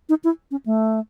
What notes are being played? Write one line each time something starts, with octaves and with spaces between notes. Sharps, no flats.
D#4
E4
C#4
A3